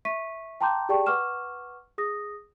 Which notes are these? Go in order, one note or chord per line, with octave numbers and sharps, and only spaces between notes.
E5 C#6 B6 D#7
G5 A5 A#5 C6 D6 G6
G4 G#4 D5 G5 A5 C#6
B4 F#5 C#6 D6 F6 E7
G#4 D#6 A#6